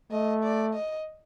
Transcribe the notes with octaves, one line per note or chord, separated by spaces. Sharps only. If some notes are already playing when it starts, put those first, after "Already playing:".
A3 D#5
D5
D#5